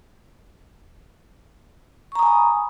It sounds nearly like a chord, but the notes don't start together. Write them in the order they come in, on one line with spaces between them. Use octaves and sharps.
C#6 A#5 D#6 G#5 B5